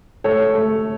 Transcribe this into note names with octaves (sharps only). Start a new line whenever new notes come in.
A3 A4 C#5
A3